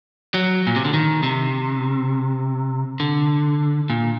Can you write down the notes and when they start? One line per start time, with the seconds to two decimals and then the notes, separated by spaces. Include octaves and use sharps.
0.34 F#3
0.67 A#2
0.76 C3
0.85 D3
0.94 D#3
1.23 C3
3.00 D3
3.90 A#2